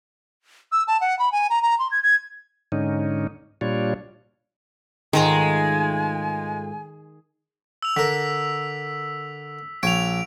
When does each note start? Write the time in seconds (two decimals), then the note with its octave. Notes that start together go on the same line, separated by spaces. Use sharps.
0.72 E6
0.88 A5
1.01 F#5
1.19 B5
1.32 G#5
1.50 A#5
1.62 A#5
1.79 C6
1.91 G#6
2.03 G#6
2.72 G#2 D3 C#4 D#4
3.61 A#2 G3 D4 F4 C#5
5.13 G#2 D#3 G#3 A3 F4 G#5 A#5
7.83 E6 F7
7.97 D3 A#4 B6
9.83 A#1 C#5 E5 D7 F7